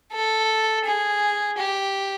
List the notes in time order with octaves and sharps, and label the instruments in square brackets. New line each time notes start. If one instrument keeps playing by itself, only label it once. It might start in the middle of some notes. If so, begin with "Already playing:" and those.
[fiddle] A4
G#4
G4